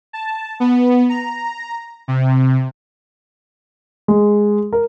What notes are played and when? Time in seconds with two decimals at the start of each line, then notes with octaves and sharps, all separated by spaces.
0.13 A5
0.60 B3
1.09 A#5
2.08 C3
4.08 G#3
4.73 A#4